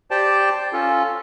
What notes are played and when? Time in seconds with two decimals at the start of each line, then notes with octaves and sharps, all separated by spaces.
0.11 G4 C5 D5 G5 A5
0.73 C#4 F4 A4